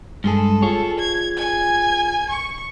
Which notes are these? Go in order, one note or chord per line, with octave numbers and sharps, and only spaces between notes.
G2 G#3 G#4 A4
F4 G#4 C#5
G#6
G#5 G#6
C#6